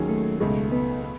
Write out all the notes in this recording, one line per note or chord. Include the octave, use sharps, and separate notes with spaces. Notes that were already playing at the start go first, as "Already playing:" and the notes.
Already playing: D#2 D#3 F#3 C#4 G#4
A3
C#2 B2 G#3 A3 D#4
B3
B3